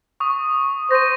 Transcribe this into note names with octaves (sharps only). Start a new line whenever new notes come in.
C#6 D#6
C5 A#6 D#7